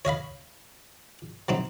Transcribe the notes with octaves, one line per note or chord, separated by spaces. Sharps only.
C#5 D#5 F5 B5
F#3 C4 D#4